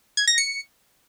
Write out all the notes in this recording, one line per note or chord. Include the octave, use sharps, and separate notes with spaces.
G#6
A#6
C#7